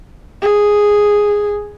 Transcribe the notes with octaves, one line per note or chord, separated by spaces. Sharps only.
G#4